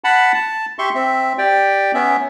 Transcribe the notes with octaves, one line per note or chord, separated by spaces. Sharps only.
F#5 A5 B5
A5
G4 E5 C6 C#6
C4 E5
G4 D5 G5
B3 C#4 E5